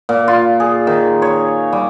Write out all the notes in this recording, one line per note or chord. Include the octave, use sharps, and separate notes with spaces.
A#2
F4
G#4
D#3
C#5
G3